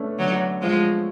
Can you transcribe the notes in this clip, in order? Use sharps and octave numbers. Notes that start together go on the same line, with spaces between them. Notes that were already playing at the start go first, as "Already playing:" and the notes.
Already playing: A3 B3 C#4 D4
D3 F#3
F3 G#3